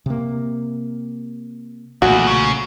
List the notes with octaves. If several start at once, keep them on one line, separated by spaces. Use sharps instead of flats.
C3 A#3
B1 E2 A#2 A3 F#4
C#3